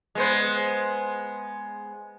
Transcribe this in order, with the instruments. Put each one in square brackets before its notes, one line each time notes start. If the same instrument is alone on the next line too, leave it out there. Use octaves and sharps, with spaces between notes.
[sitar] G#3 B3 C5